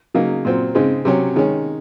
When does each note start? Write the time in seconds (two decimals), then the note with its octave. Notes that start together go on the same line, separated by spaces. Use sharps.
0.14 C#3 F#3 A#3 D#4
0.45 A#2 F#3 C4
0.75 C#3 G#3 C4 D#4
1.05 C3 F#3 C#4
1.36 D#3 G#3 C#4